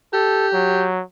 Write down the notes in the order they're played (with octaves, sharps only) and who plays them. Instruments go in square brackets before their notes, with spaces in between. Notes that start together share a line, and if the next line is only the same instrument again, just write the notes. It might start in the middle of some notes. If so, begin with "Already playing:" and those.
[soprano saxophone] G4 [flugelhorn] A4
[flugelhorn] F#3